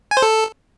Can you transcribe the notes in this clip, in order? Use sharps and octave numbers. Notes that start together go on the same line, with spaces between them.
G#5
C5
A4